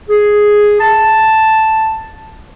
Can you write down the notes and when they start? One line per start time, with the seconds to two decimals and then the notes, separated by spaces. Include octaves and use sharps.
0.09 G#4
0.81 A5